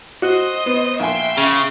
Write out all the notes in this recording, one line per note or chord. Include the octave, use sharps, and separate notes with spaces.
F#4 C5 D#5
B3
A#1 E5 G5 G#5 C6
C#3